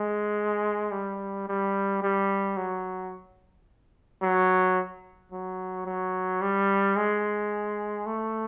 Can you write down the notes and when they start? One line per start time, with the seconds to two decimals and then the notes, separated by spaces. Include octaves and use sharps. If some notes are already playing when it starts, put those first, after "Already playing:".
Already playing: G#3
0.92 G3
1.48 G3
2.02 G3
2.57 F#3
4.22 F#3
5.32 F#3
5.86 F#3
6.42 G3
6.96 G#3
8.06 A3